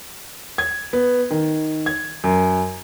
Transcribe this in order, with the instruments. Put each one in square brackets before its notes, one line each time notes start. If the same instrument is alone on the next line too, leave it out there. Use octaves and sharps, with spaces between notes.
[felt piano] G#6
B3
D#3
G#6
F#2